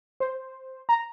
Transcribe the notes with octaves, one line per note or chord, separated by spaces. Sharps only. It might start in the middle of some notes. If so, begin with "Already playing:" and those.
C5
A#5